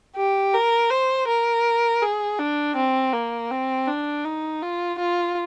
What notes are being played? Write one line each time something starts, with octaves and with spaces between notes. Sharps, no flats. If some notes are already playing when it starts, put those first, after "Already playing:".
G4
A#4
C5
A#4
G#4
D4
C4
A#3
C4
D4
D#4
F4
F4